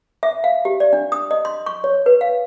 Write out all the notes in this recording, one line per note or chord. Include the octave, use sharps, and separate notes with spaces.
E5
F5
G4
D5
D4
D#6
D#5
C6
C#6
C#5
B4
F5